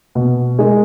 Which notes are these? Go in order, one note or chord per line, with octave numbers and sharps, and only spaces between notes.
B2
G#3 D#4 A#4